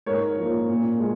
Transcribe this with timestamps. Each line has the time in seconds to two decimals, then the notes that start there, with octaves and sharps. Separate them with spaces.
0.06 G#2 A#4 C#5
0.37 F3 A#3
0.68 A#2
1.00 G#3